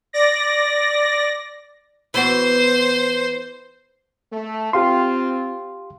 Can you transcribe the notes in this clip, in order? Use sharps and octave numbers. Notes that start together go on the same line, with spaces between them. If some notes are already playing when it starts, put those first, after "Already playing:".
D5 A#6
E3 B3 F#4 C5
A3
C4 F4 G4 F5 C6